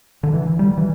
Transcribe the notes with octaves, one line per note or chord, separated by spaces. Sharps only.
D3
E3
G3
E3